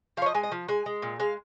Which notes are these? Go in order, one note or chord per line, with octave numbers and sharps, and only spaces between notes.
F3 C#5 F5
D#5
G#3 G#5
D#5
F3
G#3 G#5
G#3
A#2
G#3 F5